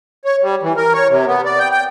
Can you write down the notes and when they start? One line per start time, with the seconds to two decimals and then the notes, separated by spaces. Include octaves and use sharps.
0.25 C#5
0.42 G3
0.63 E3
0.77 A#4
0.94 C#5
1.09 C3
1.27 B3
1.45 D5
1.59 G5
1.72 G5